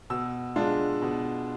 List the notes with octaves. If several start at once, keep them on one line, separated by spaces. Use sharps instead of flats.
B2 E6
G#3 D4 F4
B2